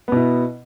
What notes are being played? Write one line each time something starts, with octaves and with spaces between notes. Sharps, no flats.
B2 B3 E4